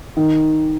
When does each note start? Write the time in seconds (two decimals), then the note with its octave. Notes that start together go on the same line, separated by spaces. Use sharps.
0.17 D#3